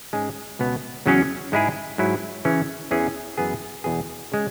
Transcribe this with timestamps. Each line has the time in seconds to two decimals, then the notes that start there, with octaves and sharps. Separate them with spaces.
0.13 G#2 G#3 C#4 G#4
0.59 C#2 B2 B3
1.06 E2 C#3 F#3 C#4 G#4
1.52 G#2 G#3 E4 G#4
1.98 G#2 F#3 E4
2.45 C#3 E3 C#4
2.91 E2 E3 C#4 G#4
3.37 F#2 E3 B3 G#4
3.84 E2 B2 B3 G#4
4.32 C#3 G#3